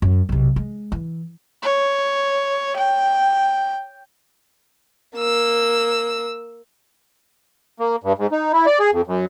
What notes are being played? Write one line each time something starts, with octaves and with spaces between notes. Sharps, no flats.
F#2
B1 C3
G#3
E3
C#5
G5
A#3 E6
A#3
G2
G#2
D#4
E4
D5
G#4
F2
F#2